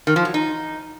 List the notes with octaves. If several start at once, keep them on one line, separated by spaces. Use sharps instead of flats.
D#3
F3
F#3
D#4